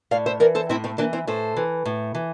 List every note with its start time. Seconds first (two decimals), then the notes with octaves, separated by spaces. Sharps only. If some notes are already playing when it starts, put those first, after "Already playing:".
0.11 A2 D5 F5
0.26 C5 E5
0.40 E3 A#4 D5
0.55 A4 C5
0.69 A2 C4 E4
0.84 A3 C4
0.98 E3 A#3 D4
1.13 C4 E4
1.27 A2 A4 C5
1.56 E3
1.85 A2
2.15 E3